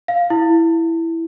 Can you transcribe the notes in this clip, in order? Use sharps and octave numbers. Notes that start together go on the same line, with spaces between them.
F5
E4